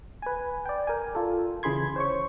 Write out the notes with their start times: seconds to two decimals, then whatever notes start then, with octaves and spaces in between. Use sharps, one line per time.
0.22 B4 G#5
0.66 D5 G5
0.87 A#4 G#5
1.15 F4 A4
1.63 C#3 E3 G#4 B5 C6 G#6
1.96 C5 C#5 C#6